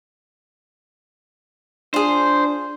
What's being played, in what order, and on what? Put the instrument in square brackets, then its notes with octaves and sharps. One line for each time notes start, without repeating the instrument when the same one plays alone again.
[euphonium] D4 [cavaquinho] F4 G#4 [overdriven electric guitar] C5